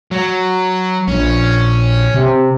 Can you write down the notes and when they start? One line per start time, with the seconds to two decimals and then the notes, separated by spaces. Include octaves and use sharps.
0.11 F#3
1.08 A#1 C#4
2.14 C3